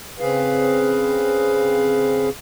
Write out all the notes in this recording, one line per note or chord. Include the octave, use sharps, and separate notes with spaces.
C#3 C4 G#4 B4 F5